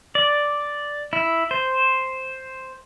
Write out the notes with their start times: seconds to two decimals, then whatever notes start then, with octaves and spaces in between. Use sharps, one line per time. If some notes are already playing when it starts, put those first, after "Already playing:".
0.15 D5
1.13 E4
1.51 C5